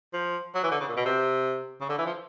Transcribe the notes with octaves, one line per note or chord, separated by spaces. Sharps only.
F3
F#3
E3
D3
C#3
A#2
B2
C3
C#3
D3
E3
F3